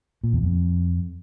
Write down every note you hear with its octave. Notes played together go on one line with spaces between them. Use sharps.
A#2
E2
F2